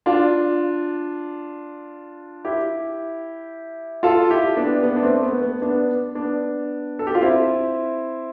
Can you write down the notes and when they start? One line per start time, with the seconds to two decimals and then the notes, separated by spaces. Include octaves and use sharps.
0.06 D4 F4
2.45 E4 G4
4.03 F4 A4
4.29 E4 G4
4.57 B3 D4
4.83 B3
4.96 D4
5.02 A3 C4
5.23 B3
5.42 B3
5.62 B3 D4
6.15 B3 D4
6.99 A4
7.07 G4
7.15 F4
7.22 C4 E4